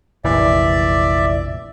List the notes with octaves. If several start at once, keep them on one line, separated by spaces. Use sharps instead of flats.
F1 A#1 E3 D5 E5